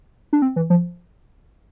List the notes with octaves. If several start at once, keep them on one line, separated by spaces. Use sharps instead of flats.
D4
C4
E3
F3